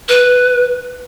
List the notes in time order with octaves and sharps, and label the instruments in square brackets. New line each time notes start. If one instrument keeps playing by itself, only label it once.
[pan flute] B4